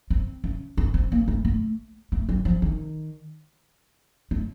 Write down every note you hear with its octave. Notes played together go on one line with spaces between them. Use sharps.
C4
C#4
C4
C4
A#3
A3
A3
A3
F#3
F3
D#3
A3